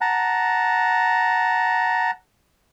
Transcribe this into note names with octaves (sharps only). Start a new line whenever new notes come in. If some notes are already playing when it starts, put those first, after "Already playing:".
F#5 A5 A#5